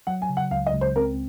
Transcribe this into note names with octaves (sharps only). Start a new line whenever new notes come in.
F#3 F#5
G#5
C#3
F#5
C#2 F5
D#5
C#2
C5
C4 A#4